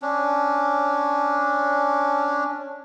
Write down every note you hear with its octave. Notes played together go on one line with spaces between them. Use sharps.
C#4 D4